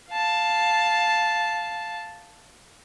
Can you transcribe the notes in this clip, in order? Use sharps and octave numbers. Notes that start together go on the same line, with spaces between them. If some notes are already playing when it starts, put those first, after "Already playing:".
F5 A5